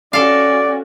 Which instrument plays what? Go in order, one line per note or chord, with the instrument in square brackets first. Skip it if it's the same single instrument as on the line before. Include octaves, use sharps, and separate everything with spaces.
[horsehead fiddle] C#4 F#4 [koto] A4 F5 [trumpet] D5